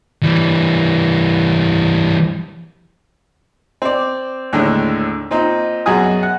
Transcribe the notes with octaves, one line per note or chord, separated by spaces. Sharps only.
E3 G3
C4 D5
D#2 A2 D3 G#3 D4
A#2 C4 D#4
F#2 B2 F#4 G#4 G#5 D#6
F#5